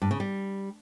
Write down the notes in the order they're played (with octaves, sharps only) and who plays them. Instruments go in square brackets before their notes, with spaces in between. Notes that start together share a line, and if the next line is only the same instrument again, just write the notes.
[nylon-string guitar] G2
C#3
G3